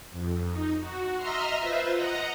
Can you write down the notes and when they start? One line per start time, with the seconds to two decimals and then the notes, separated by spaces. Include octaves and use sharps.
0.11 F2
0.49 D#4
0.79 F#4
1.16 D#5 E5 A#5 C6 F6
1.59 F4 B4 C5 E5
1.92 D#5 F#5 A#5